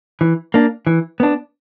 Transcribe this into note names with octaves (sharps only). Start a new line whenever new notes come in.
E3
A#3 D4
E3
B3 D4